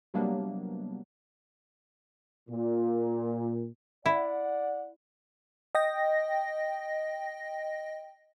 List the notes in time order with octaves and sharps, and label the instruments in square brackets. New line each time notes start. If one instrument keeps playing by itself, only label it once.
[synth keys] C3 F#3 G3 A#3 B3 D4
[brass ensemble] A#2
[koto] E4 [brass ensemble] D5 F#5
[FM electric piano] D#5 G5 A#6